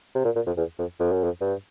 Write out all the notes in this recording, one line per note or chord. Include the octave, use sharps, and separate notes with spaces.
C3
A#2
A#2
F2
E2
F2
F2
F#2
F2
G2